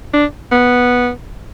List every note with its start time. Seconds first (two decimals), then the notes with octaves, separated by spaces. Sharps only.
0.13 D4
0.52 B3